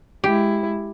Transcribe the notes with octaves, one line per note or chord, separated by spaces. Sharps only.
G#3 E4 G4